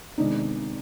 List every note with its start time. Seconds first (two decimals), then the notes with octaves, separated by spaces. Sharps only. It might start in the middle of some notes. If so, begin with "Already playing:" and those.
0.18 C3 D#3 G#3 B3 D4 D#4